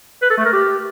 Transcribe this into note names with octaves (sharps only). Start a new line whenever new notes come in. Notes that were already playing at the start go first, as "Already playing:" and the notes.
B4
A4
A3
A#4
G4